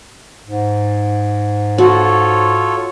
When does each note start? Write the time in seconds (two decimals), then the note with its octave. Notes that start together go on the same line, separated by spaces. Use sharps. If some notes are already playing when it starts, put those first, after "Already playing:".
0.46 G#2
1.78 F4 F#4 A4 C#5